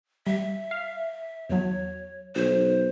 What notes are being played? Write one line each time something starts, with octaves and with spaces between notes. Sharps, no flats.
G3 E5
F5
E2 F#3 C#5
B1 C5